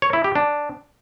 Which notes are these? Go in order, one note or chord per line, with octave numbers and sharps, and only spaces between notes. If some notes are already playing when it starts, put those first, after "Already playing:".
C#5
E4
G4
D4